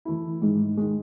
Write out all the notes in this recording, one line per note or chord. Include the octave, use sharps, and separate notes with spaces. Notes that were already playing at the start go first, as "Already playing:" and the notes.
E3 A3 E4
G#2 D#3 G#3
D#3 G#3